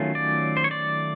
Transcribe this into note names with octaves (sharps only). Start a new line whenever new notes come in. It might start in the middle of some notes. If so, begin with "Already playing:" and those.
Already playing: D#3 F#3 A3 C#4 F4
D5
C5
C#5
D5